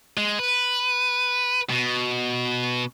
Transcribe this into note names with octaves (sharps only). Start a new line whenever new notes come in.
G#3
B4
B2